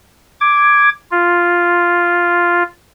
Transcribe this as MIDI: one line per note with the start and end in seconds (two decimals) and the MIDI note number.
0.41 0.89 86
0.41 0.89 92
1.11 2.63 65